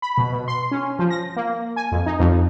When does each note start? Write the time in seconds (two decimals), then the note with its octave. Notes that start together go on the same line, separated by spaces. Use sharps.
0.02 B5
0.18 B2
0.32 B2
0.48 C6
0.71 C#4
0.99 F3
1.10 A#6
1.36 A#3
1.76 G#5
1.92 F2
2.06 D#4
2.20 F2